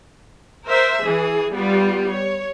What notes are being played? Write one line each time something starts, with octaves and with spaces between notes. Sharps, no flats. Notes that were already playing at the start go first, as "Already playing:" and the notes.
A#4 C5 E5
E3 G#4
G3 B3 F4
C#5